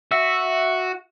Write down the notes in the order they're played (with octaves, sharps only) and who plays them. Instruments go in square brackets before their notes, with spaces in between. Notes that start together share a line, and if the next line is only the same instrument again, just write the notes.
[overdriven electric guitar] F#4 [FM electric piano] E5